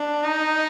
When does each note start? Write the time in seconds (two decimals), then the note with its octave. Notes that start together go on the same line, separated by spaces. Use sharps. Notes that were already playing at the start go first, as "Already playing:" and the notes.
Already playing: D4
0.24 D#4